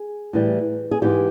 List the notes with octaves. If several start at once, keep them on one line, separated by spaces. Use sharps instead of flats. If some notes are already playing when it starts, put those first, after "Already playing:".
Already playing: G#4
A2 E3 G3
G#4
G#2 E3 G#3 G4